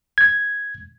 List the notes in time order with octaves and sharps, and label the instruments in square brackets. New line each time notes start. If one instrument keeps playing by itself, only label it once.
[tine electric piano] G#6